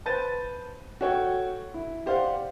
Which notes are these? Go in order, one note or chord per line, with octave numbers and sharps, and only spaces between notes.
B4 C5 A5 G6 A6 D#7
F#4 A4 C#5 G5
E4
G4 C5 D5 F5 F#5